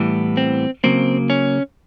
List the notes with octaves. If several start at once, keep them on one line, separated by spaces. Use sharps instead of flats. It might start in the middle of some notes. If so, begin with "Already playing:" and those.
Already playing: A2 E3 G3 B3
C4
C#3 F#3 A#3 C4
C#4